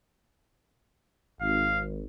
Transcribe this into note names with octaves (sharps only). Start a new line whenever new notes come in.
G#1 F5